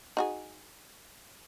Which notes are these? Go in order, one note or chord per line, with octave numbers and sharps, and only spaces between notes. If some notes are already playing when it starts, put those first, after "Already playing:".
D#4 F#4 G#4